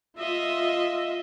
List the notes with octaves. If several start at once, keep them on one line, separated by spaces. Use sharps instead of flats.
F4 D#5 E5